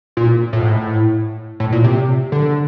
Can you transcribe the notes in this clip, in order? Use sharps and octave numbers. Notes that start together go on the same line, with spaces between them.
A#2
A2
G#2
A2
A2
A#2
C3
D3